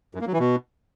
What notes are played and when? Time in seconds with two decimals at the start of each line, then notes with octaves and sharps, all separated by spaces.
0.15 F#2
0.21 A#3
0.27 F#3
0.33 E3
0.39 B2